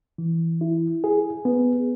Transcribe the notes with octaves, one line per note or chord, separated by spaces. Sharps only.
E3
E4
G#4
B3